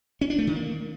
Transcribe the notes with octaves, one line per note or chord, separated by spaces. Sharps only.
C#4
D4
A3
D#3
A#3